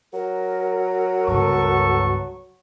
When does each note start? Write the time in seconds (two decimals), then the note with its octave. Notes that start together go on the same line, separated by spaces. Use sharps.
0.13 F#3 A#4
1.28 C#2 G2 B3 A4 C#6